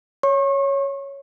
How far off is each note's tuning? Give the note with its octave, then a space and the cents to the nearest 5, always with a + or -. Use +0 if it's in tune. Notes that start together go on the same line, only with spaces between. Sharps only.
C#5 +0 C#6 -35